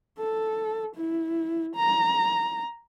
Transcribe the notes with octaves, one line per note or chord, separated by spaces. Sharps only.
A4
E4
A#5